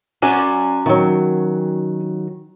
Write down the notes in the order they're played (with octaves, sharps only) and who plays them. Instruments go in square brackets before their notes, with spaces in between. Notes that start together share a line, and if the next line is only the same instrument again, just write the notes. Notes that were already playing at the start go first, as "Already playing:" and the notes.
[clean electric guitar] C#4 F#4 G#5 [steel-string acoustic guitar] D5
[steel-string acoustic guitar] D#3 F#3